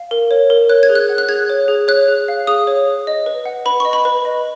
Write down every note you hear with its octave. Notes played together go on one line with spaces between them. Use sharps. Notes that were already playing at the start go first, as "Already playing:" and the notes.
Already playing: F5
A#4
C#5
A#4
C#5 F#6
G#6
G#4
F#6
F#5
F#6
G#4 G#6
C#5
G#4
C#5 F#6
G#4
F5
G#4 D#6
C#5
G#4
D#5
B4
F#5
B4 B5
D#5 C#6
B5
B4
D#5